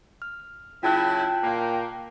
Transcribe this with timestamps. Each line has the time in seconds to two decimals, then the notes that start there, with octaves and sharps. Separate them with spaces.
0.22 F6
0.83 C#3 F#3 E4 F4 G5 A5 F#6
1.43 A#2 A#3